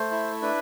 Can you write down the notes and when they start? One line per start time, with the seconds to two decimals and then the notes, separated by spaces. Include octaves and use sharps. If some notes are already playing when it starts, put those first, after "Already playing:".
Already playing: A3 C5
0.11 E4
0.42 D4 B4